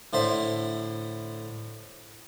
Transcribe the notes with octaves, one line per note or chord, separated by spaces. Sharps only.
A2 D3 C5 E5